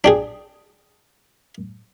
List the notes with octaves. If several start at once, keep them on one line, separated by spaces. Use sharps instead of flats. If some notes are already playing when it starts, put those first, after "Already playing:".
D4 G4 G#4